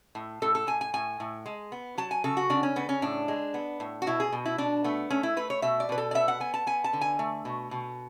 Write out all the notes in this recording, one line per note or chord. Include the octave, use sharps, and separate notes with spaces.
A2
A2 A4
A4
A2 G#5
G#5
A2 G#5
A2
G#3
B3
F#3 A5
G#5
C#3 A4
F#4
C#3 D4
C#4
C#3 B3
C#4
A2 D4
G#3
B3
A2
F#4
B2 E4
G#4
B2
E4
B2 D4
A3 B3
A3 C#4
E4
A3 B4
C#5
B2 E5
D5
B2 B4
A4
D5
B3 E5
F#5
B3 G#5
A5
B3 G#5
A5
D3
G#5
A3
B2
B2